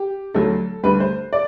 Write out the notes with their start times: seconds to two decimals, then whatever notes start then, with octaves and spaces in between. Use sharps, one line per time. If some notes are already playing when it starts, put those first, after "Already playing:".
Already playing: G4
0.34 D2 D3 F#3 A4
0.83 D2 D3 G3 B4
1.00 C5
1.33 D5